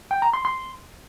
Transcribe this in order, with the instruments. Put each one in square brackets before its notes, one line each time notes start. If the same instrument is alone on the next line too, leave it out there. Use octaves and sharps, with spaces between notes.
[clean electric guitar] G5
A#5
C6
C6